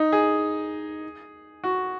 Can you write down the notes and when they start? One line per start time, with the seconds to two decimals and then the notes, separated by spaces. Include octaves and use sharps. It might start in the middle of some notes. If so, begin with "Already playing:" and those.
Already playing: D#4
0.12 G#4
1.64 F#4